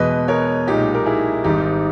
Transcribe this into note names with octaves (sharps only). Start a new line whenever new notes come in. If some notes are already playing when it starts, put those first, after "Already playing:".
Already playing: E2 B2 G#3 B4 D#5
A#4 C#5
B1 A#2 G#3 D#4 G4
A#4
E4 G#4
G#1 G#2 G3 D#4 G4